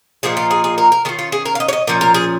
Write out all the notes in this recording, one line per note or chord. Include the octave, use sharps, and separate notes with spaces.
A#2 F3 A#3 D#4 G#4
F4
G#4
G#4
A#4
A#4
D#3 C#4 F4 G#4
F4
G#4
A#4
F5
D#5
C#5
D#5
A#2 F3 C#4 A#4
A#4
G#4